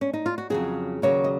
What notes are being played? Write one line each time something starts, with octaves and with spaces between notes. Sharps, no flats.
C#4
D#4
F4
F#4
F2 C#3 F#3 G#4
D#2 C#3 F#3 A#3 C#5
D#5